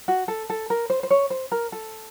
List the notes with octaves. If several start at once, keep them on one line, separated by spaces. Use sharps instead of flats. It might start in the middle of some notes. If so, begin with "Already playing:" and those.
F#4
A4
A4
A#4
C5
C5
C#5
C5
A#4
A4